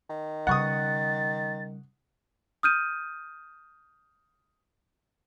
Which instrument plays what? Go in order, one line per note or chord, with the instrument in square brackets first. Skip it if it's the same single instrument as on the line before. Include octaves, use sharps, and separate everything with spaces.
[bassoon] D#3
[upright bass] C#3 G3 [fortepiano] F#5 C#6 D#6 [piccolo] A6
[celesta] D#6 F6 G6 D#7